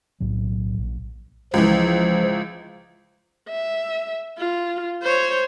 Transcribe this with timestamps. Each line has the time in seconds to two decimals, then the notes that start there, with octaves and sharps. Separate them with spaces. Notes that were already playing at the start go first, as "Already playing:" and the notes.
0.20 B1 A2 F#3
0.78 A#1
1.54 C#2 E3 F3
3.49 E5
4.38 F4
5.03 C5 C#5